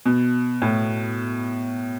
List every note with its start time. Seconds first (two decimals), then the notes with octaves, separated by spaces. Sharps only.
0.06 B2
0.62 A2